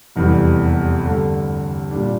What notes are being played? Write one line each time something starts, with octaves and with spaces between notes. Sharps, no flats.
F1 E2 E3 G3
G2 D3 A3
A#2 G3 D4